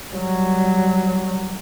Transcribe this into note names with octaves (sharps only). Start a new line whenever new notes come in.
F#3 G3